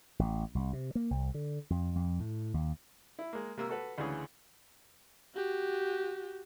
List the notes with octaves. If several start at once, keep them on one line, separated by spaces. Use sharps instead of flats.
A1
C2
C3
A#3
C2
D3
F2
F2
A2
D#2
E4
G#3 A#3
C3 A#3 E6
F#4 A4 B4
D2 C#3 E3 G#4
F#4 G4